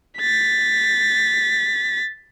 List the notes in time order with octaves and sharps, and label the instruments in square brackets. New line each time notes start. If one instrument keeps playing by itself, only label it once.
[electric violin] A6 B6